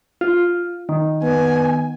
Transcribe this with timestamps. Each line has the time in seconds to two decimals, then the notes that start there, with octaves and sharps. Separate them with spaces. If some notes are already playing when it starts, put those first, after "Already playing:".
0.21 F4
0.89 D#3
1.23 B3 G#5